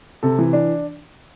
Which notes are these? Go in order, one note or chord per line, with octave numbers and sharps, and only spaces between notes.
C3 A4
E3
D4